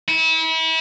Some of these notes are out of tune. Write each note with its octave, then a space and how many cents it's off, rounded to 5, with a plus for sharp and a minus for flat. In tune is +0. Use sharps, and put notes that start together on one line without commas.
E4 -35